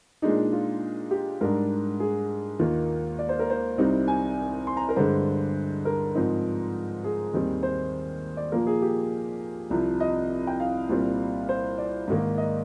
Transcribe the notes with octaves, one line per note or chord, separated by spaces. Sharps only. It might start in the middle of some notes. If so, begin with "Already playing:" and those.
A#2 G#3 D4 D#4
F4
G4
G#2 G3 D4 A#4
G#4
D#2 D#3 A#3 F4
D5
C5
A#4
C5
C2 C3 G3 C4 D#4
G#5
C6
A#5
A#4
G2 D3 G#3 D4 C5
A#4
G#2 F3 C4 D#4
G#4
D#2 D#3 G3 C4
C5
D5
A#2 F3 A#3 A#4
G#4
G4
C2 C3 F3
D#5
G5
F5
C2 A#2 G3 C4
C5
D5
G#2 D#3 A#3
D#5